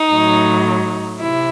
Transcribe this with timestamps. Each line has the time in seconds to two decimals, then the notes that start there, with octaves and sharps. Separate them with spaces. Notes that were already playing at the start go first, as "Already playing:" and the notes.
Already playing: D#4
0.11 A2 F#3
1.20 C3 E4